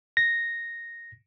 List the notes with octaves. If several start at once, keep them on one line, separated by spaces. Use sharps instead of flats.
A#6